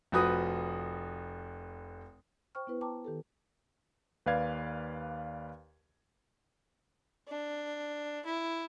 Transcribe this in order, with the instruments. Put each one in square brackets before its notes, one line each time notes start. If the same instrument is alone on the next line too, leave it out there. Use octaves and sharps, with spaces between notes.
[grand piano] F1 F3 F#4 B4 D#6
[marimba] C5 G5 C#6 F6
B3 E4 B4
G5 A5 A#5 D6
D#3 G4 A4
[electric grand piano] D#2 B4 D5 F5 G#6
[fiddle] D4
E4